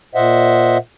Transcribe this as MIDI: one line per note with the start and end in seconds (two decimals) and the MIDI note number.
0.15 0.78 46
0.15 0.78 72
0.15 0.78 75
0.15 0.78 76
0.15 0.78 78